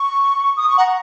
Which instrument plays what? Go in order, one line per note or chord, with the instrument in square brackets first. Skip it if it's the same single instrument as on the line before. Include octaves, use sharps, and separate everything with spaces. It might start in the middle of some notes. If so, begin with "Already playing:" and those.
Already playing: [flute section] C#6
D#6
C#6
[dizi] F#5 [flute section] A#5